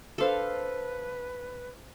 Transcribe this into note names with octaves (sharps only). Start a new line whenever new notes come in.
D4 A4 B4 C5 F5 C6 F6